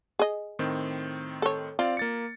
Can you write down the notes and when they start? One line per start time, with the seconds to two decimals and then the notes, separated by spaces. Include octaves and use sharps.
0.19 G#4 D#5
0.59 A2 D#3 C4
1.42 A4 C#5
1.79 C4 F4 D5 F5
1.97 A#3 A6 C#7